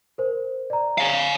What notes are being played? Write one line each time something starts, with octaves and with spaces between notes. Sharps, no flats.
A#4 C5
D5 A#5
C#5 F5